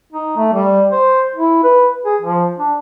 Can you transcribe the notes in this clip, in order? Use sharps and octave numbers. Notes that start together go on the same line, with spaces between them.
D#4
A3
G3
C5
E4
B4
G#4
F3
D4